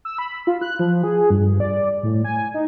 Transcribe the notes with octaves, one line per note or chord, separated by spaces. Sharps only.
E6
B5
F4
F#6
F3
G#4
G2
D5
A2
G#5
D#4